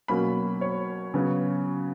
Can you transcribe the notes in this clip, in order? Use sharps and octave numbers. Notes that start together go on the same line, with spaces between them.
B2 F#3 A#3 C#4 B5
C#5
C#3 F#3 B3